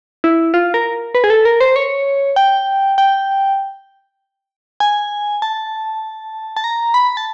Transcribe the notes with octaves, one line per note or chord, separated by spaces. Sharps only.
E4
F4
A#4
B4
G#4
A4
A#4
C5
C#5
G5
G5
G#5
A5
A5
A#5
B5
A5